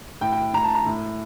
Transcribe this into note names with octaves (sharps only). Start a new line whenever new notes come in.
A2 G5
G5
A2 A#5
A5
A#5
A2